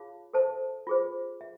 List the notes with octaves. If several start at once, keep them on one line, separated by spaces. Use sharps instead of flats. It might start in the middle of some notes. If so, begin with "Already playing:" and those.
Already playing: F4 G#4 C#5 F5 A5
A4 C5 E5 A5
F4 G#4 C5
E5